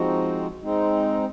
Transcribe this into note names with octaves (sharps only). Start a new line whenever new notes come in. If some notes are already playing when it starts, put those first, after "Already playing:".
Already playing: F3 G#3 C4 D#4 F#4
G#3 C4 D#4